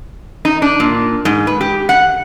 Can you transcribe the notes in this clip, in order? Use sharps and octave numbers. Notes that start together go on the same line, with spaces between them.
D#4
D4
A#2
G#2
B4
G4
F#5